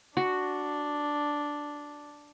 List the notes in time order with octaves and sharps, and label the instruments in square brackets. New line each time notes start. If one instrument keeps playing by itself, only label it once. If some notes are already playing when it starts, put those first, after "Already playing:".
[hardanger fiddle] D4 [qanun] F#4